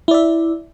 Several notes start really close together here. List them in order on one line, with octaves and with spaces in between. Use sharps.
E4 D5 E5